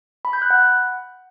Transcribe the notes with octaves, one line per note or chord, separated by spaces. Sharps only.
B5
G6
F#6
F#5